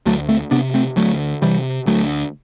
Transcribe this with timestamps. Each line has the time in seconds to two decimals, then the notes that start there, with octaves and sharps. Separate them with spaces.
0.06 D2 F#3 A3
0.29 A3 C4
0.51 C3 B3 D4
0.74 A3 C4
0.96 D2 F#3 A3
1.42 C3 E3 G3
1.87 D2 F#3 A3